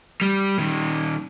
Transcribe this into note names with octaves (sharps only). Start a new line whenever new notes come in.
G3
A#2 D#3